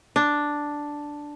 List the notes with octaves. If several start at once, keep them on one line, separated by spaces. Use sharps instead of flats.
D4